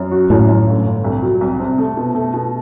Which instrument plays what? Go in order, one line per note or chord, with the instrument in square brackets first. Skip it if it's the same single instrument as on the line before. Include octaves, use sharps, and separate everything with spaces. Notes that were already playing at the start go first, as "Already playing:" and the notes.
Already playing: [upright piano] F#2
F#4
[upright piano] F#2 [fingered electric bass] A2
[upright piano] F#2
G1
G1
C2
F#3
C2
C3
A3
B2
A3
B2